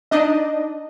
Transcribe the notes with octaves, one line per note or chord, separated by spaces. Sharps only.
D4 D#4 D#5